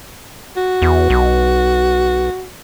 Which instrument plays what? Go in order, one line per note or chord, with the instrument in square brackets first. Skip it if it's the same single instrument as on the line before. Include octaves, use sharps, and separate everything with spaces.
[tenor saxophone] F#4
[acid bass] E2
B1